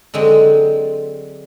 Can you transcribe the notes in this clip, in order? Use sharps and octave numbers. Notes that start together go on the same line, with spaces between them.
D3 F#3 G#3 C4